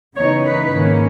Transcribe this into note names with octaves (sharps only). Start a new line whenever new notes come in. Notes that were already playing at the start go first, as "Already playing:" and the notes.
C#3 E3 B3 D#4 C#5
B4
G#2 D#3 A#3 C#4